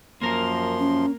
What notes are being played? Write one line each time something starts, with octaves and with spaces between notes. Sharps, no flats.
F#2 F3 A#3 A#4 C6
C#4